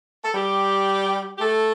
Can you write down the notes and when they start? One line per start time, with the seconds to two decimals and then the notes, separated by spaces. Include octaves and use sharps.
0.23 A4
0.34 G3 G4
1.37 G4
1.40 A3 A4